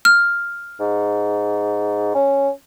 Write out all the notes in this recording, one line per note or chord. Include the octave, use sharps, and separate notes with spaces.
F6
G#2
C#4